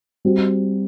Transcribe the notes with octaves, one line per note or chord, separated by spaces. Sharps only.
G3 C4 F#4